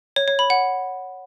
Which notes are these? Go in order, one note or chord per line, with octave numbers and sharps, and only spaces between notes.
C#5
C#5
B5
F#5